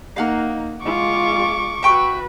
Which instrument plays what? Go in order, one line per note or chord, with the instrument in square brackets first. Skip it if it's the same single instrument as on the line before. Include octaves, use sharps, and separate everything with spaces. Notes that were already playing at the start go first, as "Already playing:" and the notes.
[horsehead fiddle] A#3 D#4 [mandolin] F5 F#5 F6
[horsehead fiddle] G#3 F4 [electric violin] C#6 D6
[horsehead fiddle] F#4 B4 [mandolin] E5 G5 C#6